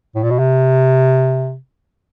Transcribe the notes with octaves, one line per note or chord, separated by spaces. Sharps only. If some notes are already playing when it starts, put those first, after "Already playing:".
A2
A#2
B2
C3